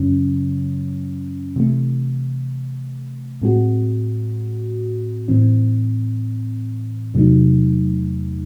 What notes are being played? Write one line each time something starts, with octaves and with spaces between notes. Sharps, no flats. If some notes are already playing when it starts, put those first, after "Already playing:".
Already playing: F#2 C#3 F#3 C#4
C3 E3 A3
A2 G#3 C4 F#4
A2 E3 C4
E2 C3 F#3 A3 D#4